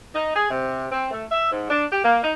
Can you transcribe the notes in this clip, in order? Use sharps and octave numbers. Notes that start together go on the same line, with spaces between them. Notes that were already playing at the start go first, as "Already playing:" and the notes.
D#4
G#4
C3
C4
A3
E5
G#2
D4
G4
A#3
D#4